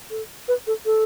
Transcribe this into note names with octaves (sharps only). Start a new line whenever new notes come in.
A4
B4
A4
A4